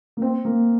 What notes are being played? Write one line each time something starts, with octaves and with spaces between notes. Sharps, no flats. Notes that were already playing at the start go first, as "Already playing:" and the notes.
A#3
C4
A#3